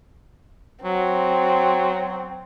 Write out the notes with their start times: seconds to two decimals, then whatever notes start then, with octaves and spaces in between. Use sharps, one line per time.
0.85 F#3 C4